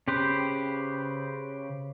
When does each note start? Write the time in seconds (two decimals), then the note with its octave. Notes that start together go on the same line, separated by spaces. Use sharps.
0.08 C#3 G4 B4 C5